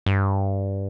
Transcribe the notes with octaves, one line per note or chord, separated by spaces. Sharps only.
G2